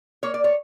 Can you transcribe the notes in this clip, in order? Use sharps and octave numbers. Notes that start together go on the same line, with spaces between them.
A#3 C#5
D5
C#5